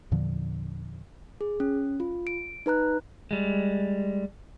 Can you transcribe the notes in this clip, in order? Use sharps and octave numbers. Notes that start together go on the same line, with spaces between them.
E2 A#2 D3 F3
G#4
C#4
F4
D7
D#4 B4 A#5 F#6
G3 G#3